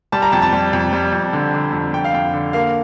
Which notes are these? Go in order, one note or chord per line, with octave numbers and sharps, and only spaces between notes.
G3 A5
A#5
F2 A5
A5
G3
F2
G3
F2
D3
D3
F2
F2 G5
F5
F2 G5
D3
A#3 F5